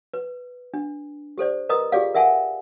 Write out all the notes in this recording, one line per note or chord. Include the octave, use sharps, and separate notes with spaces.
B4
D4
G4 A4 C5 D5
A#4 B4 D#5 A#5 D#6
F4 G4 G#4 D5 F5
A#4 E5 F#5 G#5 A5